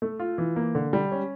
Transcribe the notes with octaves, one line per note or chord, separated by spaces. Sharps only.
A3
F4
E3
A#3
D3
G3
C#4